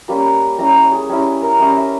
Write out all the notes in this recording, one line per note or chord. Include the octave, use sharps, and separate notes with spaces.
G3 A#3 C#4 B5
G3 C#4 E4 A#5
C#5
G#4
G3 C#4 E4 G#4
A#4
G3 C#4 E4 D#5
E5